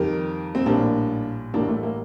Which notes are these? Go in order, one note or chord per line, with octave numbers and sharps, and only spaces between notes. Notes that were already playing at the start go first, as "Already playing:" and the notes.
Already playing: F2 D#3 G3 G4 A#4
C4
A#1 A2 G3 A#3 D4
A1 A2 G3 A#3 D4
A3
A#3